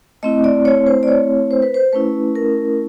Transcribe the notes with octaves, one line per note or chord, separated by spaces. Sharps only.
A3 C4 E4 D#5
D5
C#5
C5
D5
C#5
C5
B4
C5
A3 C#4 E4 B4
A#4